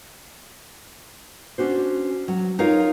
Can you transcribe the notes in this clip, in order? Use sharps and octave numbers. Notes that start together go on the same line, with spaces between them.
C#4 D4 F#4 C5
F#3
D#4 F4 A#4 C#5 F5